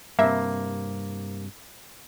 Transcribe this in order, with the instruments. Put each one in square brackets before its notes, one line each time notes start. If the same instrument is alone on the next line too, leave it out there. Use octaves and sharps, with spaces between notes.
[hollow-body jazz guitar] G2 C3 [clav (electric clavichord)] A#3 [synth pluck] E5